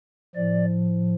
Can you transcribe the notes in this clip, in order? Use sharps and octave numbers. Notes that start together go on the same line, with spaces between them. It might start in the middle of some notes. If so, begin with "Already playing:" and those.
A2 F3 D5